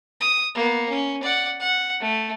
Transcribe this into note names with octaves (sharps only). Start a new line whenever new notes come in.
D#6
A#3 B3
C#4
D5 F#5
F#5
A3